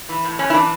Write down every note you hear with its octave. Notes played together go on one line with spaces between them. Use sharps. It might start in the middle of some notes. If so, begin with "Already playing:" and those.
E3
A2
F#2 C#4
E4
E3 D4